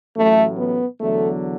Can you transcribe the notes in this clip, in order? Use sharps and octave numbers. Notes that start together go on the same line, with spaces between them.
A1 A2 F#3 A3
B3
E2 D3 F#3 A3